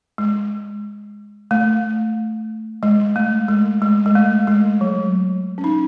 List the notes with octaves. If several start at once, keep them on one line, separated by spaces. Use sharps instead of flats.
G#3
A3
G#3
A3
G#3
G#3
G#3
A3
G#3
F#3
C#4
D#4